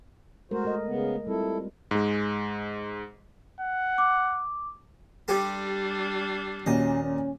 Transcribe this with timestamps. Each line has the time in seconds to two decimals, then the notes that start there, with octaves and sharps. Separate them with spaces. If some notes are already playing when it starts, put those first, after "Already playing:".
0.51 G#3 A3 F#4 A#4 C5
0.65 A#4 D#5
0.86 C#3 B3
1.27 G3 C4 E4 F4 A4
1.91 G#2 G#3
3.61 F#5
3.98 D6
5.28 G3 D4 G4 A4 C6
6.66 D#1 A#2 C#4 F#4 D#5
7.04 C#4